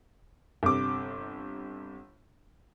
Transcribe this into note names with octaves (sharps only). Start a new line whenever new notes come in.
G1 C3 D6